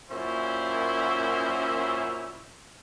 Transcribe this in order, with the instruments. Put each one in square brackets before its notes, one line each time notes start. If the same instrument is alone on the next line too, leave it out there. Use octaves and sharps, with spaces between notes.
[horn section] F#2 A#2 C#4 E4 C5